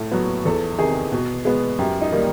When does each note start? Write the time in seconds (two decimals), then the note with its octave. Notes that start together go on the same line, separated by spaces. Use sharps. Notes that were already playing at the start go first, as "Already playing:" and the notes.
Already playing: A2 A4
0.12 F#3 B3
0.45 E2 A4
0.78 C3 D#3 G#4
1.12 B2
1.45 G#3 B3
1.79 F#2 G4
2.01 D#4
2.12 D#3 G3 A#3